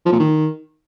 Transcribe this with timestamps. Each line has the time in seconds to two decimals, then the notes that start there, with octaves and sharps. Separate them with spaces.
0.06 F3
0.13 A#2
0.19 D#3